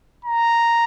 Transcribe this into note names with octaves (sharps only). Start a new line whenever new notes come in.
A#5